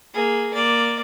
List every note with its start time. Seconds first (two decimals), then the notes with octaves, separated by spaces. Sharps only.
0.14 A#3 G#4
0.53 A#3 D5